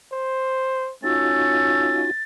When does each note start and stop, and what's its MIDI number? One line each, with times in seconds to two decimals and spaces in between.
0.12 0.92 72
1.04 2.04 57
1.04 2.09 61
1.04 2.11 63
1.04 2.11 65
1.04 2.11 66
1.04 2.23 93